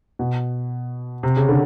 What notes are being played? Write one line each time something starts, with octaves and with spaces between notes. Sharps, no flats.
B2
C3
C#3
D3